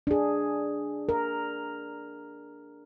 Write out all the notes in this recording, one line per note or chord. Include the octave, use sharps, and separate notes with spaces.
D4 G#4
A#4